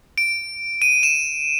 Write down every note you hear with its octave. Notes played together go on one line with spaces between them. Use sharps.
D7
D#7
E7